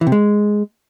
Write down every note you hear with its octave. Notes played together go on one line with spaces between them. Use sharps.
E3
C3
G#3